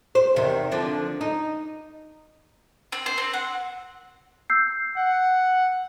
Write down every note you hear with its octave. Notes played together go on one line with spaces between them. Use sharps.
C5
E2 C3 D#3
D3 F3 D4
D#4
C4
C5
C4
F#5
E6 G6 C7
F#5